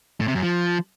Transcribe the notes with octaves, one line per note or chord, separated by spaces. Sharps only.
A2
C3
F#2
F3